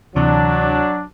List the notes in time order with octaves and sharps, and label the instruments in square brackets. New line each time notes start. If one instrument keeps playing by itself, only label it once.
[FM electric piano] D2 C3 E3 [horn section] F#3 D4